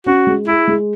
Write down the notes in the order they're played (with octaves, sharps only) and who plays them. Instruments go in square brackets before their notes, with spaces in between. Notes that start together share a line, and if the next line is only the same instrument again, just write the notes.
[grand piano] C#4 [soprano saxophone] F#4
[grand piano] G#3
[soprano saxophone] E4 [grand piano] G#4
[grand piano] G#3